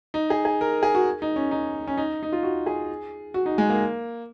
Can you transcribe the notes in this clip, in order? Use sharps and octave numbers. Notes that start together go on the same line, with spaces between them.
D#4
G#4
G#4
A#4
G#4
F#4
D#4
C#4
D#4
C#4
D#4
D#4
F4
F#4
G#4
F#4
D#4
G#3
A#3